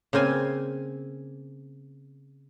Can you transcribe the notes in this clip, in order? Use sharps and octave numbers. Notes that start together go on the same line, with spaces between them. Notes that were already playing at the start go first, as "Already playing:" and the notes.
C#3 A#3 C4 G#5